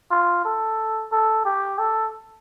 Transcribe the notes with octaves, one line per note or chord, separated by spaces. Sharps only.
F4
A4
A4
G4
A4